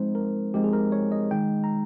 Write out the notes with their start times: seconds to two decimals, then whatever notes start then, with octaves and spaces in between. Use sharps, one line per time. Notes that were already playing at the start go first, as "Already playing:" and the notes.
Already playing: F3 G#3 C4 D#4 C5
0.15 A#4
0.54 F3 G#3 C4 D#4 G4
0.64 G#4
0.73 A#4
0.92 C#5
1.12 D#5
1.31 D#3 G#3 D#4 G5
1.64 A#5